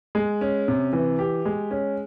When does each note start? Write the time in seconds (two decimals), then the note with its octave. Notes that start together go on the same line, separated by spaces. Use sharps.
0.15 G#3
0.41 C#4
0.68 C3
0.93 E3
1.19 G4
1.45 G#3
1.71 C#4